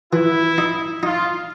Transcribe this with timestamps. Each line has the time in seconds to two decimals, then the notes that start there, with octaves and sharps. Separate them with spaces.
0.13 E3 E4
0.58 D#4
1.03 D#4 F4